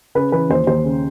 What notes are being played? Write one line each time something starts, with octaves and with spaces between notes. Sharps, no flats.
C#3 B4
E3 B4
D#2 C5
D#2 C5
C#3